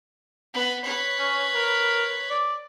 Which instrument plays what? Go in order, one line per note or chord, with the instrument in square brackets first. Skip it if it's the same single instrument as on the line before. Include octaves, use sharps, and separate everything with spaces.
[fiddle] B3 B4
B4 C#5
[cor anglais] C#4
A#4
D5